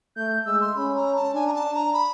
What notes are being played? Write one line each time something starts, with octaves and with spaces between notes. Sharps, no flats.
A3 G6
G#3 E6
C6
C#4 B5
A#5
A5
D4 G#5
A#5
A5
A#5
B5